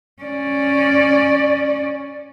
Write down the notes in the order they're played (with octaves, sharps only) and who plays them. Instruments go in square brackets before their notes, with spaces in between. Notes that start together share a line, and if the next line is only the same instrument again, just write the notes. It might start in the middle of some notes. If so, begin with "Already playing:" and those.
[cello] C#4 D5